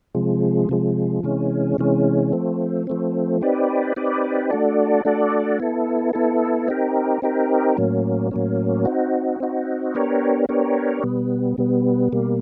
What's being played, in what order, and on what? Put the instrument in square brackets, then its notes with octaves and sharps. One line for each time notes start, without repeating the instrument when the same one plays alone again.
[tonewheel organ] C3 F3 G#3
C3 F3 G#3
C3 E3 G#3 C#4
C3 E3 G#3 C#4
F3 A3 C4
F3 A3 C4
C4 D#4 G4 B4 D5
C4 D#4 G4 B4 D5
A3 D4 F#4 A4 D5
A3 D4 F#4 A4 D5
B3 E4 A4
B3 E4 A4
C4 D#4 G4 A#4
C4 D#4 G4 A#4
A2 F#3 A#3 C#4
A2 F#3 A#3 C#4
C4 D#4 F#4
C4 D#4 F#4
B3 D4 G4 A#4 C#5
B3 D4 G4 A#4 C#5
B2 G3 B3
B2 G3 B3
B2 G3 A#3